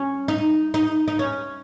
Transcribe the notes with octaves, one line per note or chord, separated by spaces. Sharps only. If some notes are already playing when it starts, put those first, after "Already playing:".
Already playing: C#4
D#4
D#4
D#4
C#4